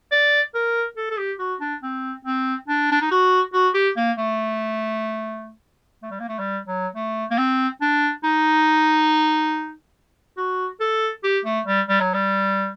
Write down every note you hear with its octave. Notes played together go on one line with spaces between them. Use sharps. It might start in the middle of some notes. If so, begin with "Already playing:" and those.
D5
A#4
A4
A4
G4
F#4
D4
C4
C4
D4
D4
D#4
F#4
F#4
G4
A#3
A3
A3
G3
A#3
A3
G3
F#3
A3
A#3
C4
D4
D#4
F#4
A4
G4
A3
G3
G3
F#3
G3